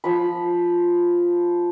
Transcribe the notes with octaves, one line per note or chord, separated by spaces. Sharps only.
F3 B5